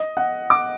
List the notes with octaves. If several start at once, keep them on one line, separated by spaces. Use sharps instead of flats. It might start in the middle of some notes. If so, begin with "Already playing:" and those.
Already playing: D#5
F#5
D6